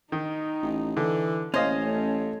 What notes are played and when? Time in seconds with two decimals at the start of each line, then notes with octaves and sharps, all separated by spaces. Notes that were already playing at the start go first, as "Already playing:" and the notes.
0.12 D#3 D#4
0.62 A1
0.97 D3 E3
1.54 A1 A#3 C#4 C5 D#5 F5
1.84 A3 C#5